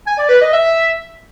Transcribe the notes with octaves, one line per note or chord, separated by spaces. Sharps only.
G#5
D5
B4
D#5
E5